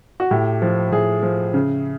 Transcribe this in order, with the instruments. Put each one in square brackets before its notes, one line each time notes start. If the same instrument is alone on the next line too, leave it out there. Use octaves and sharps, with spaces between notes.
[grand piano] F#4
A2 G4
F3
A2 G#4
F3
C#3